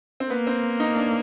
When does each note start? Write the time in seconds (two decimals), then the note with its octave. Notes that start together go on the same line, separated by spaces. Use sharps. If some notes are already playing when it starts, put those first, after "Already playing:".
0.20 C4
0.30 A#3 B3
0.47 C4
0.80 D#4
0.96 D4